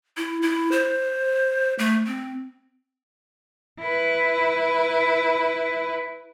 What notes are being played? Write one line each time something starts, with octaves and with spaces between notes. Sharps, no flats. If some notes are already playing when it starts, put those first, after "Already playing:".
E4
E4
C5
A3
C4
E4 B4